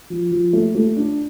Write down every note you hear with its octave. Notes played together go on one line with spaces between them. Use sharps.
F3
F3
A3
A3
D4